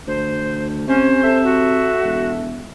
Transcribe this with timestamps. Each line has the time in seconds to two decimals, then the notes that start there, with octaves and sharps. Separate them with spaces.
0.07 D2 C5
0.88 C3 C#4 C5
1.23 A4 E5
1.44 F#4
2.04 E1